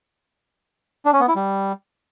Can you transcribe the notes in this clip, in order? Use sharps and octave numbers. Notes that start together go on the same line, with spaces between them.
D4
C#4
B3
E4
G3